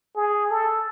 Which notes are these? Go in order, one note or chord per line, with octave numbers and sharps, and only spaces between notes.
G#4
A4